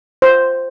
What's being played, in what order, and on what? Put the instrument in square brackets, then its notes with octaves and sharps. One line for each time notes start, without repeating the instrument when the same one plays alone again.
[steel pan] C5